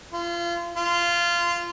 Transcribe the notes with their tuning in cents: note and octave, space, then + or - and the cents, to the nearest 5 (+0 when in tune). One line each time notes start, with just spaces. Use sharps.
F4 -30
F4 -15